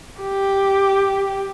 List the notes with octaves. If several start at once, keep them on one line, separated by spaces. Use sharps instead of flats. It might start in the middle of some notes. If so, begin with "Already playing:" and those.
G4